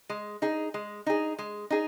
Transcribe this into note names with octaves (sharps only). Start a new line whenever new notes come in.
G#3
D#4 G#4
G#3
D#4 G#4
G#3
D#4 G#4